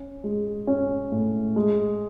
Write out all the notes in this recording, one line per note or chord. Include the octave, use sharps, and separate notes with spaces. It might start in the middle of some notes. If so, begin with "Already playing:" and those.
Already playing: C#4
G#3
C#4
A2
G#3